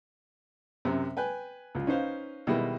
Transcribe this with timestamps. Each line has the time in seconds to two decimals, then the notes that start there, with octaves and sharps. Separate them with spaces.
0.85 F#2 C3 C4
1.17 B4 G5 G#5
1.75 C#2 F4
1.87 C#4 D#4 B4 C5 F5
2.47 B2 D#3 G3 G#3 E4